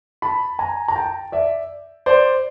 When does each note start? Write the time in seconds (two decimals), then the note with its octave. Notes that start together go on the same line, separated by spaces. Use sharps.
0.22 A5 B5
0.59 G#5 A#5
0.88 A#5
0.96 G5 A5
1.32 D5 E5
2.06 C5 D5